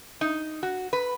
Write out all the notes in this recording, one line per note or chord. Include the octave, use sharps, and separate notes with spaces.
D#4
F#4
B4